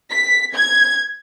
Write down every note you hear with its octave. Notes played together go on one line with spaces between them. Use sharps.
B6
G#6